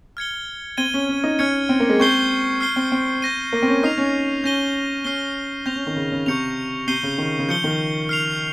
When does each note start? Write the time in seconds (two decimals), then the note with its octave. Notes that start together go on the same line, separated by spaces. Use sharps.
0.17 F6 G#6 C#7 G7
0.77 C4 G#6 D#7 G7
0.94 C#4
1.09 C#4
1.24 D#4
1.39 C#4 F6 G#6 C#7
1.69 C4
1.80 A#3
1.89 G#3
2.00 C4 C#6 G6 C7 G7
2.61 F6 C7 G7
2.76 C4
2.92 C4
3.22 G6 A#6 D#7
3.53 A#3
3.62 C4
3.68 C#4
3.83 D#4 F6 C7 F7
3.98 C#4
4.44 C#4 G6 A#6 D#7 G7
5.04 C#4 F6 C7 D#7 G7
5.66 C4 G6 A#6 F7
5.76 C#4
5.87 D#3
5.96 C#3
6.12 C#3
6.26 C3 C#6 G6 C#7 F7
6.87 C3 G6 C7 D#7 G7
7.03 C#3
7.18 D#3
7.39 C#3
7.48 F3 G6 C#7 G7
7.64 D#3
8.09 F6 C7 F7